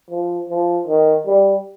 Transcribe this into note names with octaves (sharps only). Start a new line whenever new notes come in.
F3
F3
D#3
G3